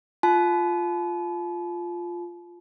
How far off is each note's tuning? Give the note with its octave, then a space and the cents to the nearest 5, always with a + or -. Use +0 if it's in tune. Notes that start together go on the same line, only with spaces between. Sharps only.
F4 +0 A5 -40